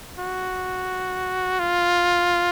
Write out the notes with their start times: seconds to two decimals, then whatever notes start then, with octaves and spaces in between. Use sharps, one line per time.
0.19 F#4
1.60 F4